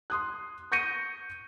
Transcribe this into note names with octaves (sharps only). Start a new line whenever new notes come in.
C6 D#6 F#6
C#6 G6 A#6 C#7 D#7